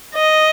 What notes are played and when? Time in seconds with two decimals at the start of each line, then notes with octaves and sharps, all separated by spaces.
0.15 D#5